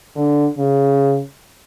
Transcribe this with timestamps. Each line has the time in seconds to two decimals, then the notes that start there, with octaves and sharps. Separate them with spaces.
0.16 D3
0.58 C#3